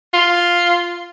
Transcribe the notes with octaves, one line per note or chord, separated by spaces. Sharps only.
F4